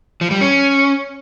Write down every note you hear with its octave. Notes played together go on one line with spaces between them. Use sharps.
F3
G3
C#4